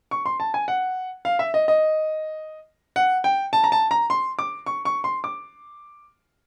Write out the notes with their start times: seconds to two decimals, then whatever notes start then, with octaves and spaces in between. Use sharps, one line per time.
0.11 C#6
0.26 C6
0.40 A5
0.54 G#5
0.68 F#5
1.25 F5
1.39 E5
1.54 D#5
1.68 D#5
2.96 F#5
3.24 G5
3.53 A5
3.64 A#5
3.72 A5
3.91 A#5
4.10 C6
4.39 D6
4.66 C#6
4.85 C#6
5.04 C6
5.24 D6